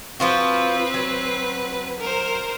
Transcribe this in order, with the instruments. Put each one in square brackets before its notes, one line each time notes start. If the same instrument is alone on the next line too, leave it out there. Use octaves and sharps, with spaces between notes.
[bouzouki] F3 F4 F#4 [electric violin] C4 B4
[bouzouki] F#3
[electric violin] A#4 C5